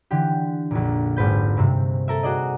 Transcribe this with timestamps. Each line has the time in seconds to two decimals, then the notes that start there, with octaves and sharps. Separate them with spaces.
0.11 D3 E3 G4
0.71 A#1 F2 A#2
1.17 G#1 G#2 B4 G6
1.57 G2 C3 C4
2.08 A4 A#4 E5
2.23 F#4 G#4 D5 D#5